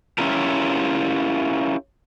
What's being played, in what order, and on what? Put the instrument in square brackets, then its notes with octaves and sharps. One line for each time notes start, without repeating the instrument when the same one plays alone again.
[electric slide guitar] C#4 E4 F4 G4 A#4